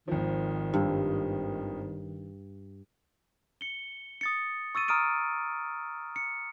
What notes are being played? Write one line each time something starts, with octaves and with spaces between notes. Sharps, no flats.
G#1 D#3 F3
G2
C#7 G7
D#6 A6 C#7
C#6 E6 A6 D#7
A#5 D#6 F6 D7 D#7
C#7